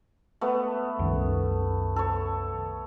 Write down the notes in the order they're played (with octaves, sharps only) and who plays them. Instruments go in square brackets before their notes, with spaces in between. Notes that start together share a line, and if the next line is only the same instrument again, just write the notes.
[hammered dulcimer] A3 B3
[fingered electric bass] C2 F#2 D#3
[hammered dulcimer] A4 C#5